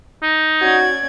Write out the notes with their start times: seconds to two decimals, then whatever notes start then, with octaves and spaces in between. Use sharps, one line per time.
0.23 D#4
0.62 C#4 F#4 D5 G#6